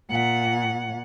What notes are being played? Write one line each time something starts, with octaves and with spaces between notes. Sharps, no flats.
A#2 F#5